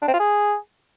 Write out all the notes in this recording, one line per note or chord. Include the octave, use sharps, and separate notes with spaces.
D4
C4
F4
G#4